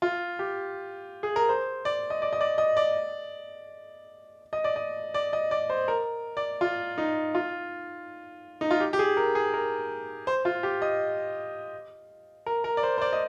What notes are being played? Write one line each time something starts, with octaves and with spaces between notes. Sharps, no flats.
F4
G4
G#4
A#4
C5
D5
D#5
D5
D#5
D5
D#5
D5
D#5
D5
D#5
D5
D#5
D5
C5
A#4
D5
F4
D#4
F4
D#4
F4
G4
G4
G#4
A#4
G#4
A#4
C5
F4
G4
D#5
A#4
A#4
D5
C5
C5
D5
D#5